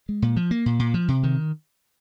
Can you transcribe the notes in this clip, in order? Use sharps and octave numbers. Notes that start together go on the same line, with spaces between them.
G#3
A#2
F3
A#3
A#2
A#2
F3
C3
D#3